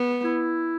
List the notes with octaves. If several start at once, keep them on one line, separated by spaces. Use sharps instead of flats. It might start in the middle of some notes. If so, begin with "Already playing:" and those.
Already playing: B3
E4